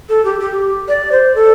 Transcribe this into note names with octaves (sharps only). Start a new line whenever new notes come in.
A4
G4
G4
D5
C5
A4